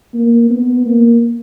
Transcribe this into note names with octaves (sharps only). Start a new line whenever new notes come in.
A#3
B3
A#3